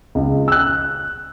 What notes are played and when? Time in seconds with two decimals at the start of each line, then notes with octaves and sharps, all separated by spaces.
0.15 C#2
0.48 E6 F#6